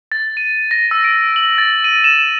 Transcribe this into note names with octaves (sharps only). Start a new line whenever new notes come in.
A6
D#7
A#6
E6
D7
F#7
A6
D#7
E7